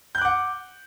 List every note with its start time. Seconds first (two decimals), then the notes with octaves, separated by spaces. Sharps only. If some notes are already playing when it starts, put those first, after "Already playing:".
0.15 G6
0.18 F#6
0.21 D6
0.25 F#5